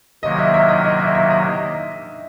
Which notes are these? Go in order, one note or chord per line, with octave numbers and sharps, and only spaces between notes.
C3 D#3 F#3 A#3 D#5
E5
E5
D#5
D#5
E5
E5
D#5